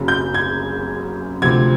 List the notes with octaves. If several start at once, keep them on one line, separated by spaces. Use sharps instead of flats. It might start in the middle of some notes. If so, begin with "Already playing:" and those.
Already playing: F#1 F#2 C#3 F#3
G6
G#6
D2 C3 F3 G#6